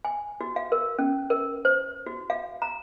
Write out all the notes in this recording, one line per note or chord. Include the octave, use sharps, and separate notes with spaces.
G#5
F#4
F5
A#4
C#4
A#4
C5
F#4
F5
A#5